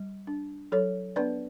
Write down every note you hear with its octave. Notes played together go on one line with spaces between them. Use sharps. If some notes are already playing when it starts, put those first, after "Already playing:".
Already playing: G3
D4
F#3 A4 C#5
B3 D4 B4 D5